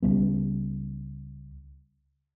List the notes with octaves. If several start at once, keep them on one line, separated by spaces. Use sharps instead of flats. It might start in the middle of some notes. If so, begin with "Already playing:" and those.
C#2 G3 B3